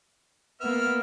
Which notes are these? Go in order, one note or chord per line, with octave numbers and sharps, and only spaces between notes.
A#3 B3 E5 F6